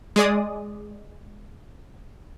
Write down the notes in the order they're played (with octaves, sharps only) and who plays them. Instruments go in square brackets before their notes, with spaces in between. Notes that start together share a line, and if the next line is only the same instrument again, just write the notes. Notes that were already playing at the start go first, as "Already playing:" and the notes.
[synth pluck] G#3 G#4 D5 D#6